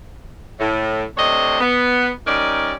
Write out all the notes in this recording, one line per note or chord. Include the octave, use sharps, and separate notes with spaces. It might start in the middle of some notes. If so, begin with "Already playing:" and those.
A2
C3 A3 C4 D4 C#5 D#5
B3
G3 C#4 D#4 A#4 D5